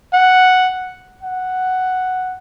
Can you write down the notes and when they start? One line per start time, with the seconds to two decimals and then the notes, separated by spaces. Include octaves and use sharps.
0.13 F#5
1.23 F#5